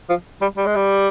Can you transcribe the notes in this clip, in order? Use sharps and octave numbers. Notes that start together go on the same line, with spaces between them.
F3
G3
G3
G#3
G3